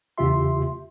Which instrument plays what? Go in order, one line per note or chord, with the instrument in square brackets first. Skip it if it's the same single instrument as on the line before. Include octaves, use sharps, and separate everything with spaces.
[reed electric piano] E2 C#3 F4 G4 E5 C6